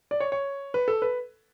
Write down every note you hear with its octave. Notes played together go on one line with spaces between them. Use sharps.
D5
C#5
C#5
B4
A4
B4